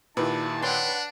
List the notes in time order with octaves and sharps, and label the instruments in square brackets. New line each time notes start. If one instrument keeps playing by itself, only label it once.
[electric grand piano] A#2 D#3 G4 [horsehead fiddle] E4 [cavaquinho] B4 [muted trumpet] A5
[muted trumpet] D4 [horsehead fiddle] B4 F#5 [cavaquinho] C#5 G5 C6